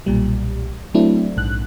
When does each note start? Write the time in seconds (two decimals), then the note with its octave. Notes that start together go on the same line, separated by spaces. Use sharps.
0.06 B1 A#2 G3
0.94 F#3 A3 C4 D4 E4
1.37 A#1 G#2 F#6